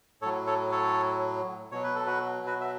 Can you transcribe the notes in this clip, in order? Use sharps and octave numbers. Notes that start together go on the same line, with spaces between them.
A2 F#3 A4 C#5
A4 C#5
A4 C#5
B2 F#3 C#5
B4
A4
F#4 B4
F#4 B4
E5